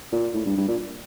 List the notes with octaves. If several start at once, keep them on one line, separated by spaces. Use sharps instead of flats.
A#2
A2
G2
G2
A#2